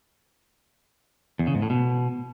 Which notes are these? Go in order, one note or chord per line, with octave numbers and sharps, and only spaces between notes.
E2
C#3
G#2
A2
B2